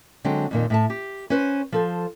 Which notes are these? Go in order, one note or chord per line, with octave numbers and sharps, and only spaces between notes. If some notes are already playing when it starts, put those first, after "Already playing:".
D3 F#3 G#3 C4
F2 A#2 D#3
A2 E5 A5
G4
C#4 B4 C5
F3 A4 C5